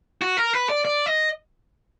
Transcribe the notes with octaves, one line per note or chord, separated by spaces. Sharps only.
F#4
A#4
B4
D5
D5
D#5